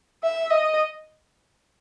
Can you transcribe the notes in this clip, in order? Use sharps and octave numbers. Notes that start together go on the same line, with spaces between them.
E5
D#5